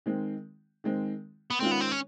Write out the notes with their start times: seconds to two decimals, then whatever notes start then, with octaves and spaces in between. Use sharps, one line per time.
0.06 D#3 G#3 C4
0.84 D#3 G#3 C4
1.51 B3
1.60 D#3 G#3 C4 C#4 F4
1.71 B3
1.81 C4
1.92 C#4